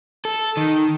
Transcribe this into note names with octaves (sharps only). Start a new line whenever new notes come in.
A4
D#3